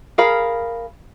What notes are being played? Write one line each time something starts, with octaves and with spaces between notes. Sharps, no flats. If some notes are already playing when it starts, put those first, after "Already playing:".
G#4 A#4 F5 B5